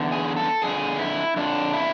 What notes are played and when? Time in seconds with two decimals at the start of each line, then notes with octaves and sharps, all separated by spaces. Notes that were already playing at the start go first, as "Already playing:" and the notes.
Already playing: E2 D3
0.12 G#4
0.36 A4
0.62 F2 D3 G#4
0.99 E4
1.36 F2 D3 D4
1.74 E4